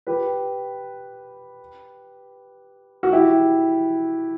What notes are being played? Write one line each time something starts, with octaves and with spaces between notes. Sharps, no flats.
G4 B4
F#4
E4 G4